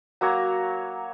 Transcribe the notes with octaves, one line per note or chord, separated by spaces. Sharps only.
F#3 A#3 C#5 A#5